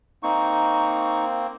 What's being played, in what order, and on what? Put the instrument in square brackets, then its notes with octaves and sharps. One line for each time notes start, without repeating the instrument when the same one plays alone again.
[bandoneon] A#3 C4 [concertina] D#4 C#6